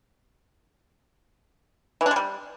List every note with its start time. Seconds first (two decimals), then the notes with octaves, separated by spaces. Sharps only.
2.01 E3
2.06 D4
2.11 G#3
2.16 G3